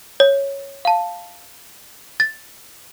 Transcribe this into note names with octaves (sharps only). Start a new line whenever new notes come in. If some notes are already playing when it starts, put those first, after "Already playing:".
C#5
F5 A5
A6